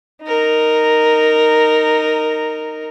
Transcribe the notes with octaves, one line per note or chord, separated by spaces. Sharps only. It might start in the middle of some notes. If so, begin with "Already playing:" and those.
D#4 A#4